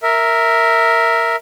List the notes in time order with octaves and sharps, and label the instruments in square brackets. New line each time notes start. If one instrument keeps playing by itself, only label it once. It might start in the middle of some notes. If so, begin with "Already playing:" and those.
[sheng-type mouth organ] A#4 E5